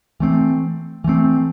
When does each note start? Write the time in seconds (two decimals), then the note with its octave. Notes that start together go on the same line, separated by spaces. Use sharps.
0.20 E3 A3 C4
1.04 E3 A3 C4